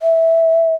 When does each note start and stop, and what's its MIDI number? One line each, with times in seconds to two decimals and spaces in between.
0.02 0.75 76